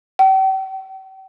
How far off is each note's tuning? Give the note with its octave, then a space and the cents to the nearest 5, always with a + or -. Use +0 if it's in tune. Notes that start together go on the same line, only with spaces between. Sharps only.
G5 -40